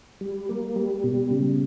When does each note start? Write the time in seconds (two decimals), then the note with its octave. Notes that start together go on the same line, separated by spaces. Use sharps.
0.21 G3
0.49 A#3
0.76 G3
1.04 B2
1.31 C#3